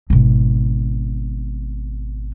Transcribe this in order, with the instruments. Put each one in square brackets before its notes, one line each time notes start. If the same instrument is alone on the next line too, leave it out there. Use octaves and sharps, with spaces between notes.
[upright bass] G#1 B2